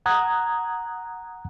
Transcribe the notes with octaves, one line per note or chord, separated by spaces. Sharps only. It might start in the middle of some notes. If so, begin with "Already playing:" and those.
F#5 A#5 D#6 F#6 G#6